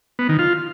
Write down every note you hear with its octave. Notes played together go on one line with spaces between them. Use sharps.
B3
D#3
F4